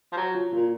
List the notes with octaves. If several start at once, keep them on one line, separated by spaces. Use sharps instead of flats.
F3
F#3
F4
A#2 F4